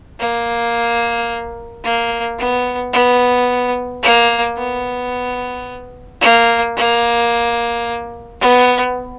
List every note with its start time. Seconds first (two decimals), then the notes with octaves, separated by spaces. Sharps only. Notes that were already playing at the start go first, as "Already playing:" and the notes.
0.20 A#3
1.84 A#3
2.38 B3
2.93 B3
4.03 A#3
4.58 B3
6.21 A#3
6.77 A#3
8.41 B3